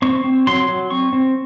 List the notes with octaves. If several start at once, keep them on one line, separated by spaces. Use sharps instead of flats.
C4 C#6
C4
F#3 C6
F#3
C4 C#6
C4